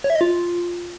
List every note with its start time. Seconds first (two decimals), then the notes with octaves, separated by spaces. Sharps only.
0.04 C#5
0.10 E5
0.15 D#5
0.21 F4